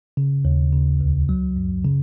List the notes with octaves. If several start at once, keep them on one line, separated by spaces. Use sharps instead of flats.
C#3
D#2
C#3
C#2
F#3
F#2
C#3